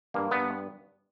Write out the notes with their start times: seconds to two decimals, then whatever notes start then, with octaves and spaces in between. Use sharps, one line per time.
0.14 G2 A#3
0.31 G2 B3